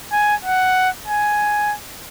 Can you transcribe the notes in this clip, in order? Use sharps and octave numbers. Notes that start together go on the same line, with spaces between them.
G#5
F#5
G#5